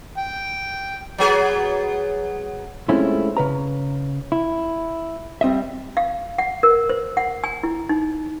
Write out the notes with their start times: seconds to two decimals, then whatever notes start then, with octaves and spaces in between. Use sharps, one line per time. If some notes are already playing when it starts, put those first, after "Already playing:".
0.18 G5
1.18 F#3 B3 G#4
2.89 G#3 A3 C4 C#4 E4 F4
3.37 C#3 B4 A#5
4.32 E4
5.41 G3 C4 D#5 E5
5.97 F5
6.38 F#5
6.63 A#4
6.89 C5
7.17 F#5
7.44 G#5
7.63 E4
7.89 D#4